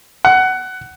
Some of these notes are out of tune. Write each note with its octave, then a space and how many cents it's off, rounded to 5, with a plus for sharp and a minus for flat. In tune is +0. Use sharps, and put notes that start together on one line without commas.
F#5 +15